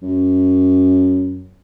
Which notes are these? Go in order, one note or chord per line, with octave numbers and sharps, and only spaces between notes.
F#2